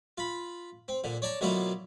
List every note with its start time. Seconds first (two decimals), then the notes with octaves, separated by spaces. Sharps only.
0.18 F4 B5
0.88 C4
1.04 A#2 D3
1.22 C#5 D5 A5 A#5
1.41 B2 D3 F#3 A#3 E4 F4